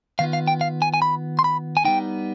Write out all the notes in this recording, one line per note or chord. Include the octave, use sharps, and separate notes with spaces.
D#3 B3 F4 F5
F5
G5
F5
G#5
G#5
B5
C6
B5
G#5
G3 B3 D#4 G5